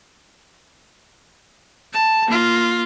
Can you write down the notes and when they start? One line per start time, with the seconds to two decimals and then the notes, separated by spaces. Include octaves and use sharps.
1.93 A5
2.27 A#3 F4